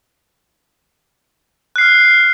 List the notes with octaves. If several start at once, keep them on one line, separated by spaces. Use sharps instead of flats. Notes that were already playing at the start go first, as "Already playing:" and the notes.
F6 F#6 C7